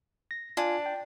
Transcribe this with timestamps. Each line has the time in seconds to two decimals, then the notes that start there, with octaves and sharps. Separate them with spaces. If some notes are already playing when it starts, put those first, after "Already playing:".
0.31 A#6
0.57 D4 F4 F5 G#5
0.86 G5